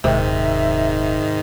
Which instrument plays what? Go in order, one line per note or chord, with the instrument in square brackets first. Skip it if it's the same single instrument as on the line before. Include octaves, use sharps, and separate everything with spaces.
[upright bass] D#1 [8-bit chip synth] G#2 D#3 [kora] C3 [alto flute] E5